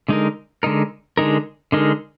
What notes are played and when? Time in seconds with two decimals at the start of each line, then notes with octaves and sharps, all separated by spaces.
0.08 D3 G#3 D#4 A#4
0.63 D3 G#3 D#4 A#4
1.17 D3 G#3 D#4 A#4
1.72 D3 G#3 D#4 A#4